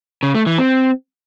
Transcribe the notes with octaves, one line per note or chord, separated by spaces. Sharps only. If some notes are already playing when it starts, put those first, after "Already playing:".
C#3
A3
E3
C4